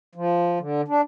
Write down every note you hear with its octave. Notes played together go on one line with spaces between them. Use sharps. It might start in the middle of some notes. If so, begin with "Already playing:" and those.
F3
D3
D4